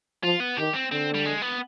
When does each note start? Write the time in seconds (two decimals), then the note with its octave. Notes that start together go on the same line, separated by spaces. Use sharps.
0.23 F3 F4
0.40 B3
0.57 D#3 G4
0.74 C4
0.91 D3 C4
1.14 G3
1.25 G#3
1.42 B3